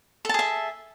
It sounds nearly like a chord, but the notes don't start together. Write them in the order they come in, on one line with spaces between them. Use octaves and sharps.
A4 A5 G#4 E5